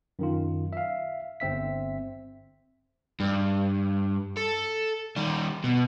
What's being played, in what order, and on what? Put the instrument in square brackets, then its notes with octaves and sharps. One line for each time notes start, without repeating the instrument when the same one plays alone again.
[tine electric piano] F#2 D#3 F4
E5 F5
G1 C4 E5 B6
[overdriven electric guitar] G2
A4
D#3 G3
B2